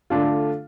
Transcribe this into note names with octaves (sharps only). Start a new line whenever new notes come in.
D3 A3 D4 F4